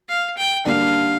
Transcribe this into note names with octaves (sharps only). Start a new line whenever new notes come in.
F5
G5
D3 G3 A#3 D4 F5